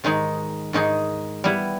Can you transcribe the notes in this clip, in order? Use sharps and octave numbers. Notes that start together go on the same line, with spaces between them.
G#2 D#3 G#3 D#4 G#4
G#2 D#3 G#3 D#4 G#4
G3 B3 E4